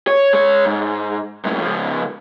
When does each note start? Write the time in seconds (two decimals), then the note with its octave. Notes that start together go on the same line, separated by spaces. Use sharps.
0.07 C#5
0.33 G#3 C#5
0.65 G#2
1.45 F#2 A2
1.61 C#2 F3